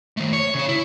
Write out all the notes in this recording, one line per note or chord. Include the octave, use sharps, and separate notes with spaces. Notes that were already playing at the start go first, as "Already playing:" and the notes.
D#3 A3
C#5
C#3 C#5
E4